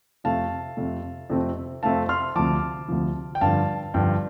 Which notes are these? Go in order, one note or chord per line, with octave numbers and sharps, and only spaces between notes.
F2 C3 A3 F5 A5
F2 C3 A3
F2 C3 A3 C4
F2 C3 A3 C4 F5 A5
C6 F6
D2 C3 F3 A5 D6
D2 C3 F3
G5
G2 D3 F3 F5 A5
G2 D3 F3 G5